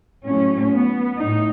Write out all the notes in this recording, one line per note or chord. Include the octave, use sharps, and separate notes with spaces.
A2 F#3 C#4
B3
A2 D#4